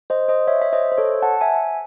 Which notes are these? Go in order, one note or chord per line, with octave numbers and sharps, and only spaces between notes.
C5 D#5
C5 D#5
C#5 E5
E5
C5 D#5
C5
A4 C#5
F#5 A5
E5 G#5